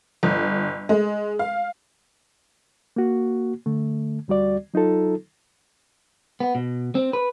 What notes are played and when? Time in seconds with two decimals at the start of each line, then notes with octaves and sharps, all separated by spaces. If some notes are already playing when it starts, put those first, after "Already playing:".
0.23 G1
0.89 G#3
1.39 F5
2.96 A#3 F#4
3.66 D3 A3
4.28 D2 G3 F#4 D5
4.74 F#3 D#4 F4 A4
6.40 B3
6.55 B2
6.95 C4
7.13 B4